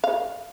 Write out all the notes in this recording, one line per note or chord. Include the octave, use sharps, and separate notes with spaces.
F5